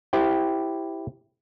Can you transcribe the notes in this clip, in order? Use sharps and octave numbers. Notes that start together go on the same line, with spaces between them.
E4 G4 C5 G5